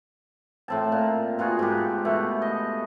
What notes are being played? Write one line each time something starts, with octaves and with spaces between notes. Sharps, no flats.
A2 C4 A5
A#2
B2 F4 F#4 G#4
G#2 G4
B2 A3
D#5